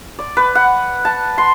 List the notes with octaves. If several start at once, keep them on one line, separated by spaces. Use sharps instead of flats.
D5
B4
F#5
A5
C6